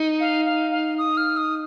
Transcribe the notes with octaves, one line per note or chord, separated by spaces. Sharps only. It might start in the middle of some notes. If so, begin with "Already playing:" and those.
Already playing: D#4
F5
F5
F5
D#6
F6
D#6